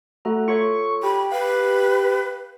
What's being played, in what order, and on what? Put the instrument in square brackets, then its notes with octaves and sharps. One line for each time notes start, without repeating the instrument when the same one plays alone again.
[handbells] A3 A4 A#5 [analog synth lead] F#4
[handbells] F4 A4 C#5 [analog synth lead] C#6
[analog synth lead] G4 [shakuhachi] B5
[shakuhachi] B4 [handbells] F5 F#6